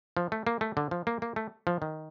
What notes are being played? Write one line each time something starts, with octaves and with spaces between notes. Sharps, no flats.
F3
A3
A#3
A3
D3
F3
A#3
A#3
A3
F3
D#3